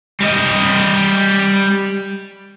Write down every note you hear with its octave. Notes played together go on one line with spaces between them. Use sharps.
G3 D#5